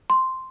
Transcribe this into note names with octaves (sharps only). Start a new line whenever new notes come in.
C6